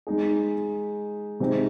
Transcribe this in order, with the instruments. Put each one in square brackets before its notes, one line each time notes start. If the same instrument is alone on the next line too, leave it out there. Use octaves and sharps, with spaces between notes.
[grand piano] G#3 D#4 G#4
C3 G#3 C4 D#4 G#4